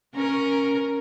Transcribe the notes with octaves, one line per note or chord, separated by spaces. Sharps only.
C#4 A#4